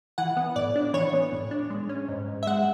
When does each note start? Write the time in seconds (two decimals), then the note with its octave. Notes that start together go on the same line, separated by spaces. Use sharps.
0.18 E3 F#5
0.37 B3
0.56 A2 D5
0.76 D4
0.93 E3 C#5
1.13 B3
1.32 A2
1.51 D4
1.70 G#3
1.89 C#4
2.08 G#2
2.28 G#2
2.43 E5
2.47 G#3 F#5